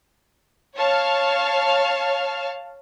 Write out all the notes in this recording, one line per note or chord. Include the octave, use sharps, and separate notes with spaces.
C#5 F5 A5 F6